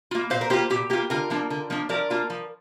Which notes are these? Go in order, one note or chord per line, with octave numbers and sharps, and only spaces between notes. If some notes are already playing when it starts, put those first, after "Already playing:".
A#3 F4
A#2 C5 F5
A#4
A#3 F4 G4 C5
A#2 G4
A#3 F4 G4
D3 F4 A#4
F3 A#3 D4
D3
F3 A#3 D4
F3 A#4 D5
A#3 D4 F4
F3